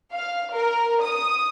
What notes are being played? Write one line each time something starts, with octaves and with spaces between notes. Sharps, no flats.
F5
A#4
D#6